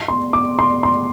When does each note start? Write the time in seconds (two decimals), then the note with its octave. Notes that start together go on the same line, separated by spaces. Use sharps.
0.08 C6
0.33 D6
0.59 C6
0.83 C6